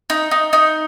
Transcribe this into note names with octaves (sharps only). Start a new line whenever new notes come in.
D#4
D#4
D#4